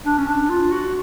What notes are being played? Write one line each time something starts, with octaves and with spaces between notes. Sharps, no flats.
D4
C#4
D4
F4
F#4